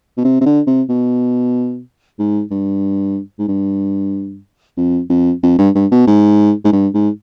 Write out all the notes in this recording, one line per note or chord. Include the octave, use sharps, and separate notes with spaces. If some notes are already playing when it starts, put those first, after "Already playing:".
B2
C3
C3
D3
C3
B2
G#2
G2
G#2
G2
F2
F2
F2
G2
G2
B2
G#2
G#2
G2
G#2